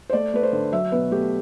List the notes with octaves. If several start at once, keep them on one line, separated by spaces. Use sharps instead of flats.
C5
A3 D5
A3 B4
C5
D3
F#3 E5
B2 B4
A3 G4